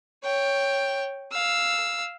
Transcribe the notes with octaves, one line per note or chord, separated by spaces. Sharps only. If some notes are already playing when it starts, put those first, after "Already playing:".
C#5 G5
F5 E6